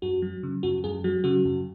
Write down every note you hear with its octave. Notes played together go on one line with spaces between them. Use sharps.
F#2 F#4
F#3
C#3
F#2 F#4
F#2 G#4
F#3 F#4
C#3 F#4
F#2